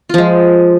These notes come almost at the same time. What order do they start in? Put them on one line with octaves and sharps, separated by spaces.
F4 F3 G#3